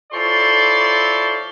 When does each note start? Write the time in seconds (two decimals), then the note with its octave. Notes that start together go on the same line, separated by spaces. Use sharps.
0.12 F3 E4 A4 C#5 D5 C6